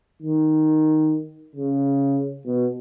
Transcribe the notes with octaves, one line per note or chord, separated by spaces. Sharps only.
D#3
C#3
B2